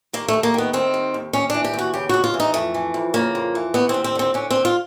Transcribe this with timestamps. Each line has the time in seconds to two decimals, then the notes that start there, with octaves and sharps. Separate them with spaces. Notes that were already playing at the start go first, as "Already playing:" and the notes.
0.13 D#2 A#3
0.28 A3
0.34 D#2
0.43 A#3
0.54 D#3 B3
0.73 D#3 C4
0.94 D#2
1.14 D#2
1.33 D#2 C#4
1.50 E3 D4
1.64 G4
1.74 D#2
1.79 F#4
1.94 C#3 G4
2.09 D#2 F#4
2.24 F4
2.34 E3
2.40 D#4
2.54 F2 A3
2.74 E3
2.94 F2
3.14 C#3 A#3
3.35 F2
3.55 E3
3.74 D#2 B3
3.89 C4
3.94 D#2
4.04 C4
4.15 D3 C4
4.34 D3 C#4
4.51 D#2 C4
4.65 F4